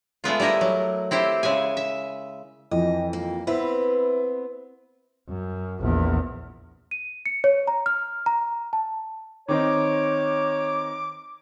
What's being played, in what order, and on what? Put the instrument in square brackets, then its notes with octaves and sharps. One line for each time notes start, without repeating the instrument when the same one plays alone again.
[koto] G#3 A3 B3 F4
G3 A3 E4 A#4 D#5
F#3
C4 E4 G4 C5
C#3 G#3 E5 G#5
E5
[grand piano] F2 E3 [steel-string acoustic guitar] D#5
[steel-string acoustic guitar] A#3
[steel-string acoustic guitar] B3 C4 B4 [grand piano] E4
[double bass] F#2
A#1 E2
[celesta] D#7
C#7
C#5
A#5
F6
A#5
A5
[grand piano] D#3 C4 D#4 [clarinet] C#5 [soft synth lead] D6